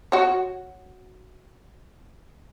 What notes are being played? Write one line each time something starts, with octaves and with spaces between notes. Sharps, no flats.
F#4 C#5